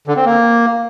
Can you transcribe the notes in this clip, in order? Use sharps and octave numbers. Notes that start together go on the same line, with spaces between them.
D3
C4
A#3